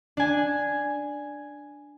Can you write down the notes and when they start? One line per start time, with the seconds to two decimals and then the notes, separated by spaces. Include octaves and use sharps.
0.17 D4 G#5